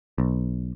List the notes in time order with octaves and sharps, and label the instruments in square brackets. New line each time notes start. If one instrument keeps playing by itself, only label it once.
[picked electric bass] B1